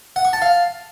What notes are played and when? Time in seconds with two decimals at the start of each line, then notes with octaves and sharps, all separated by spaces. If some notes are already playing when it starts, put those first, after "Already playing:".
0.16 F#5
0.25 C#6
0.33 A5
0.42 F5